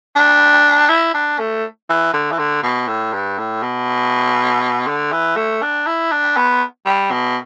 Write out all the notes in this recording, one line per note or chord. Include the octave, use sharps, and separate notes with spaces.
D4
E4
D4
A3
E3
D3
E3
D3
B2
A2
G2
A2
B2
D3
E3
A3
D4
E4
D4
B3
G3
B2